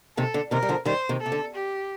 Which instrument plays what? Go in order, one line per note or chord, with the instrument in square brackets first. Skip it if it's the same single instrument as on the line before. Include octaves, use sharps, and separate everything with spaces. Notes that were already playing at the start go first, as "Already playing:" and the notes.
[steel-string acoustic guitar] C3 D#3 [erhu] A4
[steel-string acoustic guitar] D3
[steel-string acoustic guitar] C3 D#3 [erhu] A#4
[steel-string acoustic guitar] G3
D3 F3
[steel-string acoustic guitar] D#3 G3 [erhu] C5
[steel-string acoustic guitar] C3 D#3
[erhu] A4
[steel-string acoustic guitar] C3
D3
[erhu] G4